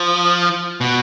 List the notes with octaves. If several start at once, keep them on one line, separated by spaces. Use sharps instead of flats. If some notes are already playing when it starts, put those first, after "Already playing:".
Already playing: F3
B2